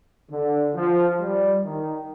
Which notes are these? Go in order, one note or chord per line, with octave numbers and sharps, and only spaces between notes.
D3
F3
G3
D#3